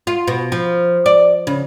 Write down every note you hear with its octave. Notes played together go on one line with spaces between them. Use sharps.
F4
B2
F3
D5
C#3